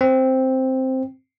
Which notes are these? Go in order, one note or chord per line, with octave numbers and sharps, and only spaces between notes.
C4